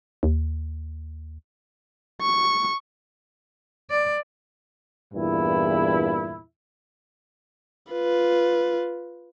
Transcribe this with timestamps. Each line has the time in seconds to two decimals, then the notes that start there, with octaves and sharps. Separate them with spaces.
0.23 D#2
2.22 C#6
3.91 D5
5.14 E2 G2 A#2 E4
7.93 F4 B4